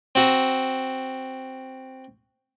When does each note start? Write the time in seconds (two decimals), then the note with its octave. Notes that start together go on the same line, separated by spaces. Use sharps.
0.15 C4 F#4 A#5